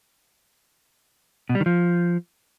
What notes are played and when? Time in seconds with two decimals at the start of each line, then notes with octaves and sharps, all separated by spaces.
1.49 B2
1.55 G3
1.60 D#3
1.66 F3